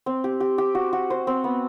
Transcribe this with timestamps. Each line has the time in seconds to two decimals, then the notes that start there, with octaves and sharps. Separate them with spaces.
0.06 C4
0.24 G4
0.40 G4
0.58 G4
0.75 F#4
0.93 F#4
1.10 C5
1.27 C4
1.44 B3